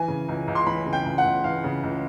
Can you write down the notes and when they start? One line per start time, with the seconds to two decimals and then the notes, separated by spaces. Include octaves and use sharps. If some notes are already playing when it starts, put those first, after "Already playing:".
Already playing: E3 G#5
0.08 C#3
0.28 C#2
0.48 C#2
0.55 C6
0.67 E3 B5
0.86 C#3
0.93 G5
1.06 C#2
1.18 F#5
1.25 C#2
1.44 E3 F5
1.64 C#3
1.83 C#2